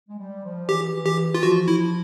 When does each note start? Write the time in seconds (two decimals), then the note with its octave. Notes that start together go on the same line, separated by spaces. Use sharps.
0.09 G#3
0.18 G3
0.44 F3
0.69 E3 G4
1.05 E3 G4
1.34 F4
1.43 F3 F#4
1.68 E4